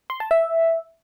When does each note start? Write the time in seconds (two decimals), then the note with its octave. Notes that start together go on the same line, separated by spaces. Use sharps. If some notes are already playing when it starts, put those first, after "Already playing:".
0.10 C6
0.20 A5
0.31 E5